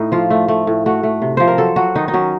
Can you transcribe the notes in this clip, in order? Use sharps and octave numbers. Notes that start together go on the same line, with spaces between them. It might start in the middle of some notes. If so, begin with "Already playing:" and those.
Already playing: A2 D#4
F3 F4
A3
A3
A2
A3 F#4
A3
C3
F3 C5
A#4
F#3 A4
F#3 F#4
D#3 D#4
D#4
F#3 C#4